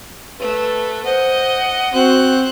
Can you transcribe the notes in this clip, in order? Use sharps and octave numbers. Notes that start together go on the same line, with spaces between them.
A3 B4
C5 D#5 F#5
C4 F#4 C5 F#6